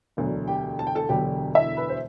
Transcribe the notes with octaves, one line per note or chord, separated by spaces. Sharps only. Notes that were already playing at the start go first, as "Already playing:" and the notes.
E1 D2 D3 F#3
G4 G5
A5
G5
A4 A5
E1 D2 D3 F#3 G4 G5
E4 E5
B4
C5